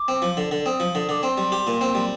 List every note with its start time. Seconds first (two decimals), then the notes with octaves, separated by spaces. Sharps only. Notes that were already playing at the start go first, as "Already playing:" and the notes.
Already playing: D6
0.08 C4
0.22 F3
0.37 D3
0.51 D3
0.66 C4 D#6
0.80 F3
0.95 D3 D#6
1.09 D3 D6
1.23 C4 C6
1.38 G3
1.52 G4
1.67 A#2
1.81 C4
1.95 G3